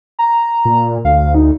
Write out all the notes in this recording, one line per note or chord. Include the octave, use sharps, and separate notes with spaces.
A#5
A#2
D2 F5
D#4